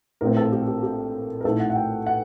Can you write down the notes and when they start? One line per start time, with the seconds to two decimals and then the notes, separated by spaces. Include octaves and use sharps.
0.21 A#1 A2 A3 C4 A#4
0.37 A4
0.52 G4
0.68 G4
0.83 G4
1.41 A#4
1.44 A#1 A2 A3 D#4 A4
1.60 F#5
1.70 F#5
1.76 G5
2.07 F#5